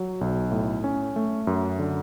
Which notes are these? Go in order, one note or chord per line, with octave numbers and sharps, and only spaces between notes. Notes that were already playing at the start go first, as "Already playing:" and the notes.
Already playing: F#3
B1
A2
C#4
A3
F#2
D3